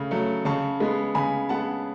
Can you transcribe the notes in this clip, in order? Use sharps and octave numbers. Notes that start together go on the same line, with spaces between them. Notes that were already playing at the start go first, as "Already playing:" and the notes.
Already playing: C#3 A3
F#3 A3
C#3 A5 C#6
G#3 B3
C#3 G#5 B5
G#3 B3 F#5 A5